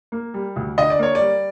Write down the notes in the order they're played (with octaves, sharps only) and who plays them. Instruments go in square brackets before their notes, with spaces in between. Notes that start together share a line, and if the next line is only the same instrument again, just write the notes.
[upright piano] A#3
G3
D2
D3 D#5
D5
A#3 C#5
D5
G3